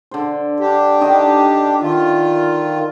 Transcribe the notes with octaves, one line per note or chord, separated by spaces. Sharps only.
D3 C5
D4 G4
D3 D#3 D#5
D#3 F4 E5